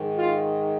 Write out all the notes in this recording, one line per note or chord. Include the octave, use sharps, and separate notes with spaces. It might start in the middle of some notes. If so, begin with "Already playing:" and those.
Already playing: G#2 D#3
F4